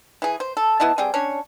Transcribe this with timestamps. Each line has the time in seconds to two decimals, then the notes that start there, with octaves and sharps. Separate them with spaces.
0.22 E3 G#4
0.40 C5
0.57 A4
0.80 B3 E4 D#5 A5
0.98 G3 C4 G#4 G5
1.14 C#4 D4 C#5